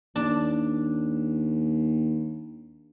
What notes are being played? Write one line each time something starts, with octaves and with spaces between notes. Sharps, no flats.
D#2 D4